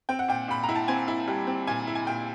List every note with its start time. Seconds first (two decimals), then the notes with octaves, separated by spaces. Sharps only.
0.09 C4 G5
0.19 F#5
0.28 A#2 G5
0.48 A#2 B5
0.63 A#5
0.69 E4
0.76 A5
0.88 C4 G#5
1.08 E4
1.28 G3
1.47 C4
1.67 A#2 G#5
1.87 E4
1.95 G#5
2.07 A#2 G5